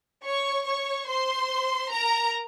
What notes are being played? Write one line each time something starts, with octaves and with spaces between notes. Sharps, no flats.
C#5 C#6
C#5 C#6
C5 C6
A#4 A#5